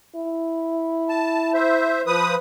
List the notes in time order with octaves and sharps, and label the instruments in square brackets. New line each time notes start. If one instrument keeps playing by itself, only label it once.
[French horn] E4
[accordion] A5
C5 E5
F3 B4 D#6